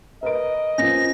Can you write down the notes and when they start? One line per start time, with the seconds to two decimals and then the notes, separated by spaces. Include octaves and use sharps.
0.23 A#4 B4 D#5 D7
0.78 F3 A#3 C#4 A#6